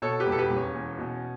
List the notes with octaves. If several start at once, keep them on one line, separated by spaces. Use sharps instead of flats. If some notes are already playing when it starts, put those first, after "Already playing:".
B2 A4 C#5
G4 B4
E1
A4
G4 B4
E1
C#4
E2
B2